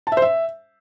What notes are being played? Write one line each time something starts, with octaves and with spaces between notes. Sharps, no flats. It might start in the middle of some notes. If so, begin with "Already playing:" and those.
A5
E5
C5
E5